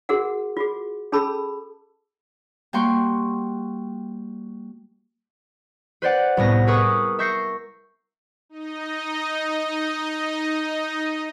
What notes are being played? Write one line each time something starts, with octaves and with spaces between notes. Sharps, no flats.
F#4 G#4 A#4 F#5
F4 F#4 G#4
C#4 G#4 A4 A5 B5 E6
G3 A#3 F#4 G5 C6 C#6
B4 C5 D5 F#5
C2 A2 B3 A#6
G#4 A#4 B4 C#6 D#6
E5 C#6 G6 A#6 C7 C#7
D#4 D#5